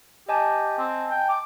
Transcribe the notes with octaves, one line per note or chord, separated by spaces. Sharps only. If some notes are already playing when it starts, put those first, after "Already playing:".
G4 D#5 G#5 A5
C4
G5
D6